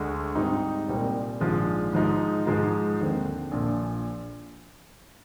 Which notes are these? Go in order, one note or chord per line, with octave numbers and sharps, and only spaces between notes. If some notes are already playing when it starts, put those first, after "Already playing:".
Already playing: D2 D3 G#3 D4
G#2 G3 C4 D#4
C2 A#2 G3 C4
A#1 G#2 F3 G#3
G#2 F3 G#3 D#4
G#2 F3 G#3 D#4
D#2 D3 F3 C4
A#1 A#2 F3